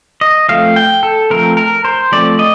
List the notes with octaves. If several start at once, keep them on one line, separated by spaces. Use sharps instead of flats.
D#5
F3 A3 C4 F5
G5
A4
F3 A3 C4 A#4
A#4
C5
F3 A3 C4 D5
D#5